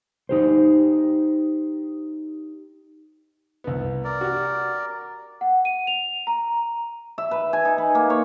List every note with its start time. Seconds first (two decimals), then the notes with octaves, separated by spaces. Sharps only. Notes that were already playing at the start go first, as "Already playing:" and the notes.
0.29 D#4 G4 C5
3.64 C2 B3
4.05 A#4 D5
4.21 F#4 G4
5.41 F#5
5.65 D#7
5.87 F7
6.27 A#5
7.18 E5
7.31 B4
7.53 G#5
7.65 D#4
7.78 B4
7.95 A#3
8.10 C#5